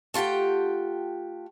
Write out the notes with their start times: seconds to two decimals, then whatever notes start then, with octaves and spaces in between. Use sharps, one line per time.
0.14 A3 F4 G4 F#5 G5